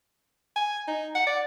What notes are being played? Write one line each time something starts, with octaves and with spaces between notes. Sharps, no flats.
G#5
D#4
F#5
D5